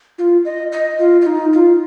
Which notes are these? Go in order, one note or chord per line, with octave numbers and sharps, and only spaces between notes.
F4
D#5
D#5
F4
F4
D#4
F4